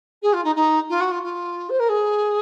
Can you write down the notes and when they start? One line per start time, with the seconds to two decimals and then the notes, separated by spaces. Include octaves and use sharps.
0.22 G#4
0.33 F4
0.44 D#4
0.55 D#4
0.89 F4
1.00 F#4
1.11 F4
1.22 F4
1.69 C5
1.79 A#4
1.89 G#4